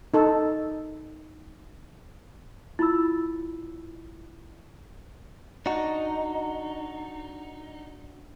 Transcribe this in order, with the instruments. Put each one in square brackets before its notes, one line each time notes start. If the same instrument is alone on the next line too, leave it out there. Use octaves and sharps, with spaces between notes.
[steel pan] D#4 A4
[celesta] E4 F4 B5 E6
[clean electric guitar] D4 F#4 [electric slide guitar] D#4